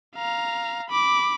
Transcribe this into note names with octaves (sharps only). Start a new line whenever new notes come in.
F5 A#5
B5 D6